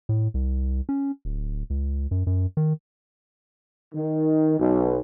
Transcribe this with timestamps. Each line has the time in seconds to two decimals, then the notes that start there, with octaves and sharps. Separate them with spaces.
0.09 A2
0.34 C2
0.89 C#4
1.25 D1
1.70 C#2
2.11 F#2
2.27 F#2
2.57 D#3
3.94 D#3
4.58 B1